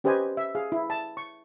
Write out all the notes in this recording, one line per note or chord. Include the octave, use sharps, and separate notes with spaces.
C#4 G4 B4 C5 D#5 G#5
E5
G#4 F5
E4
A5
C#6